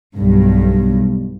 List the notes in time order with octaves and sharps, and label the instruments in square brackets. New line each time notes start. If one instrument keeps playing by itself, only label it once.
[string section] B1 G2